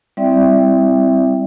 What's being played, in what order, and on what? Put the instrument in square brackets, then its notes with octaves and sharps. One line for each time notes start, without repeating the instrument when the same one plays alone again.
[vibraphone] G3 C4 E4 D5 E5 G5